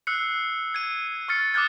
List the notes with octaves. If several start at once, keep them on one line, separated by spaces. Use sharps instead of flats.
E6 F#6 C7 C#7
G#6 D#7
C#6 F6 A6 C#7
D6 D#6 F6 F#6 G#6 A6